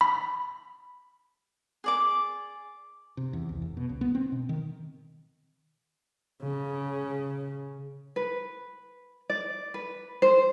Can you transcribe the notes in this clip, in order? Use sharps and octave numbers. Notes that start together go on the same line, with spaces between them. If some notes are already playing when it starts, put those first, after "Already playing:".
B5
G#4 D5 D6
C3
E2
C2
F1
B2
C#2
B3
C4
B2
D#3
C#3
B4
D5
B4
C5